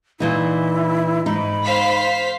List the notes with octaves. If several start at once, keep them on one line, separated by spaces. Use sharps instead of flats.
A#2 E3 D#4 E4
G#2 D#4 B5
C5 F5 B6